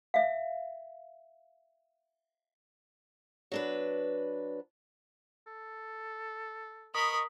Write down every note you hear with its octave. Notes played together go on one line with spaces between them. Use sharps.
E5 F5
F#3 D4 B4
A4
A#4 D#5 B5 C#6 D#6